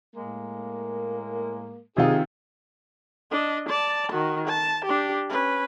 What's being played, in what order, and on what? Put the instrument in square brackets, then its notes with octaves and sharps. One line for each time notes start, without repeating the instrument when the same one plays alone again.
[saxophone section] A2 G#3 A#3
[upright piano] C3 D#3 F4 [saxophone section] G#4
[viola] D4 D#5
D5 A5
D#3 F#4
A5
D4 G4
C#4 B4